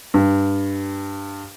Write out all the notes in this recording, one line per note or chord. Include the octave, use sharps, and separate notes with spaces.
G2